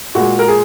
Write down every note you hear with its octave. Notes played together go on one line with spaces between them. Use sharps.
A#2 G#3 F#4
A#4
G#4